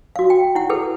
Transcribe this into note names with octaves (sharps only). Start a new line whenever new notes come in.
F#4 F5
G5
E4 F#5
G#4 A4 B4